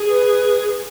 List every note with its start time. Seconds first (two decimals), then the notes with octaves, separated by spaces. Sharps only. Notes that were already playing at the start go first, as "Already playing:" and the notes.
Already playing: G#4
0.09 B4